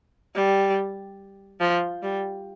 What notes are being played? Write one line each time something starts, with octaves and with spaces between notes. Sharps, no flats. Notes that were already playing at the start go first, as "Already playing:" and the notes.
G3
F3
G3